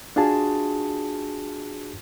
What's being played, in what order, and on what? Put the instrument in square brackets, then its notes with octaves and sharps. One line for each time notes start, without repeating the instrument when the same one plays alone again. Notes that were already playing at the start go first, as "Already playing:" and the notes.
[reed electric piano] D4 F4 F#4 G#4 A5